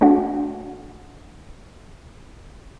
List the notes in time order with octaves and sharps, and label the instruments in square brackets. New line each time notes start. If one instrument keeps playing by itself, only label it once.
[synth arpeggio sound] A3 D4 F#4